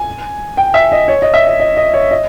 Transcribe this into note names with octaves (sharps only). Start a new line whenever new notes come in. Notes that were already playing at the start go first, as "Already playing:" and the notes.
Already playing: G#5
G5
E5
D#5
C#5
D#5
E5
D#5
D#5
D#5
C#5
D#5